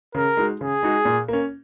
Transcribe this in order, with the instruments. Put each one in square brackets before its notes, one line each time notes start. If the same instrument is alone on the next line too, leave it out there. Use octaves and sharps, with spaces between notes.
[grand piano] C#3 [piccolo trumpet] A#4
[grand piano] G#3 D#4 F#4
[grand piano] C#3 [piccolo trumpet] G#4
[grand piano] G#3 D#4 F#4
A#2
A#3 C#4